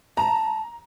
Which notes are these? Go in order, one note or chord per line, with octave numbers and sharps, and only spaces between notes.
A5 A#5